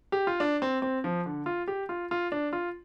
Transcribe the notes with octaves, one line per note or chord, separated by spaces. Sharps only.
G4
F4
D4
C4
C4
F3
D3
F4
G4
F4
F4
D4
F4